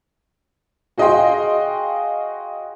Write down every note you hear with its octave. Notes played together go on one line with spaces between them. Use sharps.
F#4 G#4 D#5 F5 G5 C6